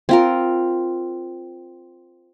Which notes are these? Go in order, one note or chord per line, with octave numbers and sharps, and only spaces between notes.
C4 F4 A#4